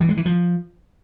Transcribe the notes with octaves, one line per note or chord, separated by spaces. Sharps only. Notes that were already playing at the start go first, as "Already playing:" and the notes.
E3
G#3
E3
F3